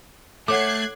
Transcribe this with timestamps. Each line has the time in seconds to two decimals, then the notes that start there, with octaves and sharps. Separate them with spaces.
0.48 A3 A4 C#5 F#5 D6 F#6 G#6 C7